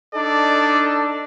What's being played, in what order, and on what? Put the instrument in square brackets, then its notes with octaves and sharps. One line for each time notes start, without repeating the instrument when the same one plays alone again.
[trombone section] D4 D#4 A4 [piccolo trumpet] D5